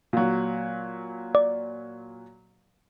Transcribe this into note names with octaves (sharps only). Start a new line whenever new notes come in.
A#2 F#3
D5